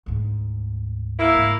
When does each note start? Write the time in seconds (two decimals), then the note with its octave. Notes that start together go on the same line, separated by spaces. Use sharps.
0.06 D2 G#2
1.18 A#3 E4
1.34 G#2 C#3